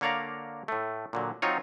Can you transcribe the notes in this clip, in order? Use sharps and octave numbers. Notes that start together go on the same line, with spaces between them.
D3 A#3 C#5 D5 F5 A#5
A2 A3
A#2 D3 F#3
F#3 C4 D#4 F4 C#5